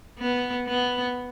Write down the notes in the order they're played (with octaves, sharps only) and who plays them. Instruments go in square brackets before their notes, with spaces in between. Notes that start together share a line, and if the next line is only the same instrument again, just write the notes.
[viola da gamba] B3
B3